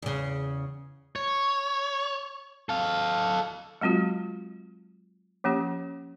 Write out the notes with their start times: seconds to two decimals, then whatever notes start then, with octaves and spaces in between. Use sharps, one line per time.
0.02 E2 C#3
1.16 C#5
2.69 A4 F5
3.81 F#3 G#3 C4 F4 F#4
5.44 F3 A#3 C#4 G4